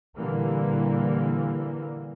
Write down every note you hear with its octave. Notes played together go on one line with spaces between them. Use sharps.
A#2 D3 E3 G3 A#3